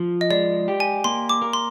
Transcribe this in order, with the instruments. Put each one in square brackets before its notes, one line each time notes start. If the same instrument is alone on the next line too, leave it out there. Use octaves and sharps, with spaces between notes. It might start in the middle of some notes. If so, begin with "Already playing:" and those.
Already playing: [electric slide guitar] F3
[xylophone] D#5
[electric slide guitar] G#3 [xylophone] D5
[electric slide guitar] G4
[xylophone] G#5
[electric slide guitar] A#3 [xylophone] C6
[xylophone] D6
[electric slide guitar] A#4
[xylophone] C6